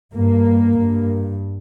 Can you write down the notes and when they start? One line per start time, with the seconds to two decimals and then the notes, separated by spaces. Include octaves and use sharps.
0.16 G2 A#3
0.78 G2